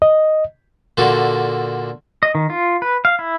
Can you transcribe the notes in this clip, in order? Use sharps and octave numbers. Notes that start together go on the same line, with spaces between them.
D#5
A#2 D3 F#4 A4
D#5
D#3
F4
B4
F5
E4